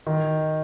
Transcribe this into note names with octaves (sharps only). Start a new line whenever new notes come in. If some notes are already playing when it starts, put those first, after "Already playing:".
D#3